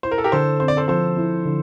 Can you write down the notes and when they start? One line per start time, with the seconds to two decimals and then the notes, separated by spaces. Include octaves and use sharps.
0.03 E4 C5
0.11 A#4
0.18 A4
0.24 G4 A#4
0.32 D3 A4 C5
0.60 C4 C5
0.68 D5
0.77 A4 C5
0.88 F3 A4 C5
1.17 E4
1.45 D3